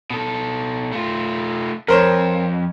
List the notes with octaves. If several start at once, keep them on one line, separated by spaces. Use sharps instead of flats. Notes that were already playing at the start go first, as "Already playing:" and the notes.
B2 A4
A3 F4
F2 A#4 C5 C#5